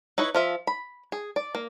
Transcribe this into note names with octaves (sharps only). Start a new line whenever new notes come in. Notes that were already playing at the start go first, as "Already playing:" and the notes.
D#4 E4 B4 C#5
F3 F4 E5
B5
G#4
D5
A#3